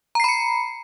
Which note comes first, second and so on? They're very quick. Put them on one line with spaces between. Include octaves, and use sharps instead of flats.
A#5 C7 B5 C#7